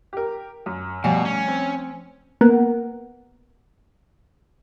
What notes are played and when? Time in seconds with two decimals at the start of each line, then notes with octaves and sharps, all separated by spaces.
0.13 G4 A#4
0.66 F#2
1.04 B2 F3 G3 A3 G#5
1.25 C#4
1.48 C4
2.41 A#3 B3 A#4 F#5